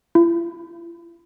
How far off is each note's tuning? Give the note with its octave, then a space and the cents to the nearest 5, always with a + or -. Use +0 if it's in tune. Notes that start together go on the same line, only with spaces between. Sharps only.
E4 +45